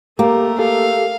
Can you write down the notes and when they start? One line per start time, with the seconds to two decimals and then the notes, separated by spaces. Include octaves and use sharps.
0.19 A3 A#3 G4 A#4
0.59 G4 A4 F5